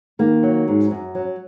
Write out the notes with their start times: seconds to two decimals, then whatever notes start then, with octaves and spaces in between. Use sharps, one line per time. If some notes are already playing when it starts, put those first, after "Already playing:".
0.19 D#3 A#3
0.43 F#3
0.68 G#2
0.91 F#2
1.15 F#3